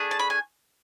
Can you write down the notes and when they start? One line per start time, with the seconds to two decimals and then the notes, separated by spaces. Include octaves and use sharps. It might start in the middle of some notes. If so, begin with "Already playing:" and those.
Already playing: A3 D4 G#4
0.11 A5
0.19 B5
0.30 G#5